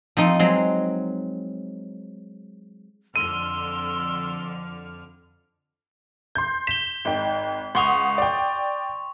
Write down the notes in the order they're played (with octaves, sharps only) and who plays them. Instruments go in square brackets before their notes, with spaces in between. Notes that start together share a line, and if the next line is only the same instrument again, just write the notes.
[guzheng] F3 C4 D#4
F#3 G#3 C4
[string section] F2 D3 F6 [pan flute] C6 [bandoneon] E6 [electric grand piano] D#7
[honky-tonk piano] C6 G6
[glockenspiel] B6 G7 [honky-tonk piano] E7
[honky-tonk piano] G#1 D#4 G5
[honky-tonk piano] C#2 F#5 D#6 [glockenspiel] C6 C#6 F7
[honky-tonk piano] D5 G5